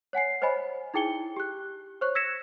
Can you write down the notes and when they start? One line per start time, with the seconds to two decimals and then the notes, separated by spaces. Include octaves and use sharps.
0.13 C#5 F#5 G#5 C7
0.42 C5 C#5 D#5 G#5 B5
0.94 D#4 E4 G#4 G5 C#7 G7
1.37 G4 F#6
2.01 C5 C#5 C#6 F#6
2.15 E6 G#6 A#6 B6 C#7 E7